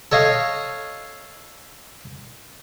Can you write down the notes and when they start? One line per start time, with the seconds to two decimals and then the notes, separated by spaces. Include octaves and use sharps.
0.12 A4 C#5 D#5 F5